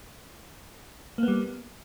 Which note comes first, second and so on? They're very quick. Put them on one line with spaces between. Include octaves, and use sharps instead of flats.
A#3 B3 G3